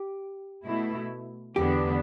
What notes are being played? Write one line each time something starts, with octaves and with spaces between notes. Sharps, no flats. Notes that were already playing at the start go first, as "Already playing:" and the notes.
Already playing: G4
B2 A3 E4
E2 D3 B3 D4 G4